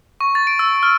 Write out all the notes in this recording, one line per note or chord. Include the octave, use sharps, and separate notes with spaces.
C#6
A6
D7
E6
F6